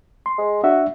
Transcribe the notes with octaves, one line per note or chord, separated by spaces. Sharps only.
C6
G#3
D4 F#4 E5